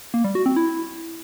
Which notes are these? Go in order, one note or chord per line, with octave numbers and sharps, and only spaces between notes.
A#3
G3
F#4
C4
E4